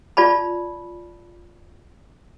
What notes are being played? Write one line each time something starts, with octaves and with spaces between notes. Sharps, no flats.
F4 D5 A5 B5